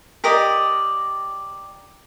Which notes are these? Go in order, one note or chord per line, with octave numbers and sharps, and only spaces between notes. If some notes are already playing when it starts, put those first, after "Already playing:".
G4 A#4 D5 D#5